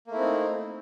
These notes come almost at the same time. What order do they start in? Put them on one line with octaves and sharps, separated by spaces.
A#3 A3 E4 C4 D#4